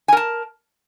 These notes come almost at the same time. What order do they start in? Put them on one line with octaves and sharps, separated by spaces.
G#5 A#4 A5